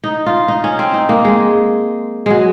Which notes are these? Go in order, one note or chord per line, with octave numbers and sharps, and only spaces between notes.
D#4
F4
D#4
C#4
C4
D#4
A#3
G#3
F#3 G#3